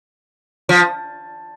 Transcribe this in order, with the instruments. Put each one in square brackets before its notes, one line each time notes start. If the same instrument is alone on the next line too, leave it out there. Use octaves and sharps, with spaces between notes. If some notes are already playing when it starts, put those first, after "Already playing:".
[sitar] F3